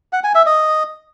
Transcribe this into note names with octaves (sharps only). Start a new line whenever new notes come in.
F#5
G#5
E5
D#5